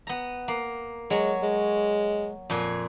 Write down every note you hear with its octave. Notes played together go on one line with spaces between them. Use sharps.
B3 A#5
A#3
F#3 G#3 C#5
G#3
F2 A#2 G#5